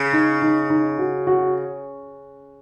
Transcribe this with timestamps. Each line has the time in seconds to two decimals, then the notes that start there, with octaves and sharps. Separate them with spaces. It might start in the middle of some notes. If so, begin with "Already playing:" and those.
Already playing: C#3
0.13 D#4
0.42 D#4
0.70 D#4
0.99 F#4
1.27 F#4